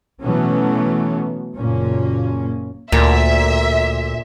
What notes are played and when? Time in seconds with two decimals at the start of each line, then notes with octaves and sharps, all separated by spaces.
0.22 B2 E3 F#3 A3 B3 C#4
1.56 F#1 A#2 A#3 C#4
2.92 D2 A#2 E5